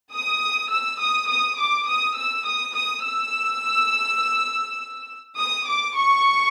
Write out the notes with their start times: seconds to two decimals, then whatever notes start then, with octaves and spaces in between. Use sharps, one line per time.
0.12 D#6
0.71 E6
1.00 D#6
1.28 D#6
1.58 D6
1.88 D#6
2.16 E6
2.45 D#6
2.74 D#6
3.05 E6
5.38 D#6
5.67 D6
5.96 C#6